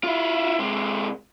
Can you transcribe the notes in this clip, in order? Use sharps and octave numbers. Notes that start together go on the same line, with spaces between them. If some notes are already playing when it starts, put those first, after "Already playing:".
E4 F4
C3 G#3